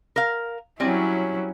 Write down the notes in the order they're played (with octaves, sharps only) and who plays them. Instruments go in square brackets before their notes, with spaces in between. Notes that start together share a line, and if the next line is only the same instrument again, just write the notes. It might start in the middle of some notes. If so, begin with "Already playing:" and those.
[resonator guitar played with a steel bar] A#4 F5
[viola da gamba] F#3 C#4 E4 [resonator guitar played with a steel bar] G3 C4 G#5